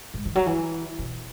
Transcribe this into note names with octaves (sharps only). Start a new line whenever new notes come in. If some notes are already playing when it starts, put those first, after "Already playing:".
G#2
D#3
F#3
E3
B2